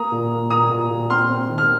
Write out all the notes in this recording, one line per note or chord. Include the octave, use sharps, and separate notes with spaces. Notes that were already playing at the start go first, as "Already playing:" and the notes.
Already playing: A#3 A#5 D#6
A#2
A#3
A#2 A#5 D#6
A#2
A#2
C4 C6 F6
C4
D#3
F6